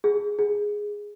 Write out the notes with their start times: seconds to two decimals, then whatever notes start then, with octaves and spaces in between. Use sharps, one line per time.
0.04 G#4
0.39 G#4